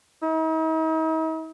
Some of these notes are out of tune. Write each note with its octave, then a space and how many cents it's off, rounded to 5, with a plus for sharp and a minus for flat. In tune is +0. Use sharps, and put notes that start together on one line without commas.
D#4 +45